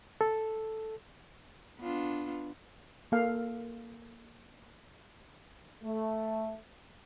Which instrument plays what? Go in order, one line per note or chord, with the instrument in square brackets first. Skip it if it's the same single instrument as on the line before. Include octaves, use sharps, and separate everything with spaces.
[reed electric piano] A4
[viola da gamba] B3 D4 F4
[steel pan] A#3 A4 F5
[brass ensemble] A3